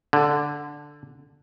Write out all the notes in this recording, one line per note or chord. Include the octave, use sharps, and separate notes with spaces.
D3